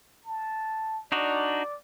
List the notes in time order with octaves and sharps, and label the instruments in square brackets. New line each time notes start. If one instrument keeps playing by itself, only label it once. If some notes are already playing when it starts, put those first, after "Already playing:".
[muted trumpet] A5
[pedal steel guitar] D4 D#4 F#4 [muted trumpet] D5